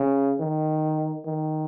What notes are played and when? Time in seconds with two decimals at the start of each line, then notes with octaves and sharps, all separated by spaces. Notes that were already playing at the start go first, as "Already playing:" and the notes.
Already playing: C#3
0.40 D#3
1.25 D#3